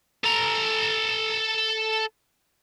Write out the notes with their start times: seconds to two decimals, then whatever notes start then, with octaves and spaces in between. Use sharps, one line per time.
0.24 A4 A#5